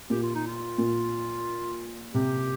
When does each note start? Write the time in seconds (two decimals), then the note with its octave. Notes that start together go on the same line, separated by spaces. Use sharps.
0.10 A#2 G4
0.23 F4
0.35 D#4
0.47 F4
0.78 A#2
2.14 C3 G4